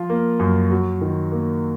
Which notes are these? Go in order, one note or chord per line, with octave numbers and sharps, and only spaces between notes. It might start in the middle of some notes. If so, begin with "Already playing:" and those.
Already playing: F3 F4
A#3
F#2
F#3
D#3
A#3